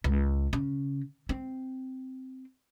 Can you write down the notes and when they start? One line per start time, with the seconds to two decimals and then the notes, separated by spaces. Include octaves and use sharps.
0.04 C#2
0.53 C#3
1.29 C4